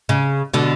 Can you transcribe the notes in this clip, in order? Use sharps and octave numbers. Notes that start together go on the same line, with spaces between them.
C#3
B2 D3